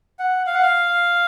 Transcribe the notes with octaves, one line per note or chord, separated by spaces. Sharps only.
F#5
F5
F#5
F5